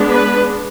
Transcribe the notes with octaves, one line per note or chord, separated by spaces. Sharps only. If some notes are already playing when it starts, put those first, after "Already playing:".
Already playing: G#3 B3 D4
B4